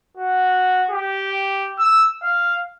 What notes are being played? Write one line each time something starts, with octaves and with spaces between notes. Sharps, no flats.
F#4
G4
E6
F5